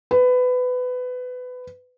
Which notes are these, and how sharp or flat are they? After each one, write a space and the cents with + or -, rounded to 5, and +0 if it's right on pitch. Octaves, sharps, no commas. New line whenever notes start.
B4 +20